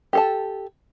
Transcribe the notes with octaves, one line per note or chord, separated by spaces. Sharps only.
G4 A4 A5